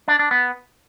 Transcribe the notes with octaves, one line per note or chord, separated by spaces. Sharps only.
D4
D4
B3